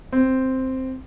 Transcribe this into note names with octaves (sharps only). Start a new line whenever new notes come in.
C4